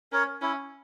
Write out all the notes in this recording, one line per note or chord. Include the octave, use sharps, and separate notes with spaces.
C#4 A#4 C#5
C#4 E4